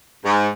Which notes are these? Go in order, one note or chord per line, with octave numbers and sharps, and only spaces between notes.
G#2